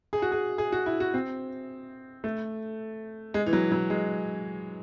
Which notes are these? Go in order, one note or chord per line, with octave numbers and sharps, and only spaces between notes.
G#4
F#4
G#4
G#4
F#4
E4
F#4
C4
A3
G#3
E3
F#3
F#3
G#3